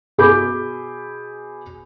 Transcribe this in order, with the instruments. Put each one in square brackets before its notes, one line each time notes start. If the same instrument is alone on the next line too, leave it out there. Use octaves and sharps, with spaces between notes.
[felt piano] B2 G#4 B5 D6 G6